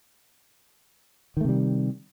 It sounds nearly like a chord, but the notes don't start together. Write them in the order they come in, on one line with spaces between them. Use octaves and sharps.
D#3 A3 C3 G3